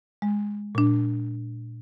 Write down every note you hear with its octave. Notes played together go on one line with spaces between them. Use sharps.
G#3
A#2 D4